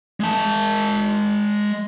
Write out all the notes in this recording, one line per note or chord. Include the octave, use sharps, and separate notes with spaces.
G#3 A5